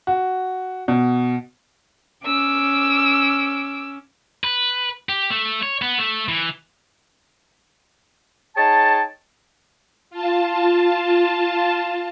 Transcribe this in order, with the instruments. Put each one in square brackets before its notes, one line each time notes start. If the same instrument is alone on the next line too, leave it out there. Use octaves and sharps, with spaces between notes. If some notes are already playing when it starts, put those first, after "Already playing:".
[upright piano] F#4
B2
[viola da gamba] C#4 [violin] D6 E6
[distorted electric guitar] B4
G4
A3
C#5
B3
A3
E3
[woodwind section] D#4 G#4 C#5 G5 A5
[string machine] F4 A5